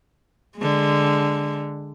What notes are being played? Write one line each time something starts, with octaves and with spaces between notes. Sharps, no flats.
D3 G#3